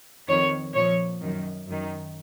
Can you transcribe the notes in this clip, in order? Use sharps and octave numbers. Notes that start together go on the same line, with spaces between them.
F2 D#3 C#5
A#2 F3 C#5
F#2 D#3
F#2 D#3